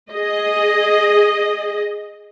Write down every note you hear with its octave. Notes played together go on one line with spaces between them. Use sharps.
G#4 D#5